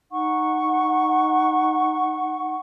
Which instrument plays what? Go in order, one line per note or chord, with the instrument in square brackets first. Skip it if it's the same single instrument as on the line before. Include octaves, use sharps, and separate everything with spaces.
[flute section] D#4 F#5 C#6